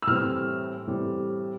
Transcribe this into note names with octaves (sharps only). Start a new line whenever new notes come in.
E6
A2 E3 G3 C4 F6
A2 E3 G3 C4